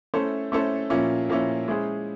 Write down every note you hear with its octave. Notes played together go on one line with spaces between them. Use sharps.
A3 C#4 E4 A4 C5
A3 C#4 E4 A4 C5
A#2 F3 A#3 C#4 E4
A#2 F3 A#3 C#4 E4
G#3 C#4 E4 G#4 C5